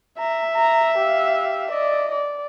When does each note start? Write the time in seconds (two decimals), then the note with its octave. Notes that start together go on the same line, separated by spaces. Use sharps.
0.19 E5 A#5
0.54 A#5
0.98 G4 F5
1.71 D5 D#5
2.12 D5